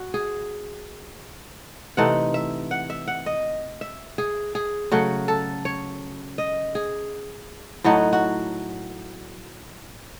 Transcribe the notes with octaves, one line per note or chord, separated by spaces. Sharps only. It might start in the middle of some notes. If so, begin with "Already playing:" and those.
Already playing: F#4
G#4
C3 E3 A3 D#4 F#5
E5
F#5
E5
F#5
D#5
E5
G#4
G#4
C#3 F#3 A3 F#4
A4
C#5
D#5
G#4
A2 F#3 A3 D#4 F#4
F#4